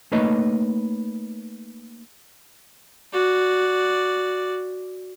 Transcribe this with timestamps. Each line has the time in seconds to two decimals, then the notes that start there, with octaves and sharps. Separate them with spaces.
0.12 A3 A#3 D#4 B4 C#5 D#5
3.13 F#4 D5